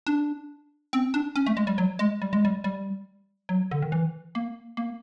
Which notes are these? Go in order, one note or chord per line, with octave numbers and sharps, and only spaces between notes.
D4
C4
D4
C#4
A3
G#3
G3
F#3
G#3
G3
G#3
G3
G3
F#3
D3
D#3
E3
A#3
A#3